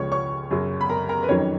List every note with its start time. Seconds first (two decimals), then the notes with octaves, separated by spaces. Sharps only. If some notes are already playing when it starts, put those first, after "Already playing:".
Already playing: C#2 C#3 F3 C#5 C#6
0.11 C#5 C#6
0.51 F#2 C#3 F#3
0.81 B5
0.89 A#4 A#5
1.09 A#4 A#5
1.23 B4
1.28 F2 D#3 F#3 C#4 C#5